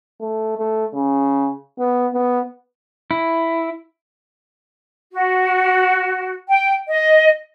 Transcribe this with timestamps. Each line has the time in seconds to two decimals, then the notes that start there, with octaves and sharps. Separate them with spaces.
0.20 A3
0.58 A3
0.94 C#3
1.78 B3
2.13 B3
3.11 E4
5.11 F#4
6.47 G5
6.88 D#5